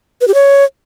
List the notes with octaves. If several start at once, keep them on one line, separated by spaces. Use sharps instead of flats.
B4
G4
C#5